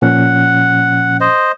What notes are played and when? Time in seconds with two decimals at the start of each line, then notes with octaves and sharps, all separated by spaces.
0.02 A#2 F3 C#4 F#5
1.20 C5 D#5